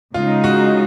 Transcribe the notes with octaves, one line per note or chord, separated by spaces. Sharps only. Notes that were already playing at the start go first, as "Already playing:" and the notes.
C#3 G#3 D#4 F4
F#4